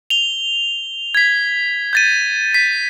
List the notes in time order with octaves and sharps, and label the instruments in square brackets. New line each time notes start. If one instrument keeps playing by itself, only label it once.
[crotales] F7 G7
G#6 B6
G6 A6 D#7
B6